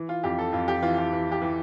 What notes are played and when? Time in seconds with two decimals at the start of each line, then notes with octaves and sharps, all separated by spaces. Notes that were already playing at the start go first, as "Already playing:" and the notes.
Already playing: E3
0.09 F4
0.24 F2 G4
0.39 A4
0.53 F2 F4
0.68 G4
0.82 E3 F4
0.98 F4
1.13 E3
1.32 G4
1.42 E3